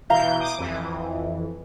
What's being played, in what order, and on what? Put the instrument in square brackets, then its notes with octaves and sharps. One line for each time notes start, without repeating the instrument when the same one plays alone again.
[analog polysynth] B2 E3 G6 [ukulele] E4 F5 A#5
[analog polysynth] D6 D#6
F2 E3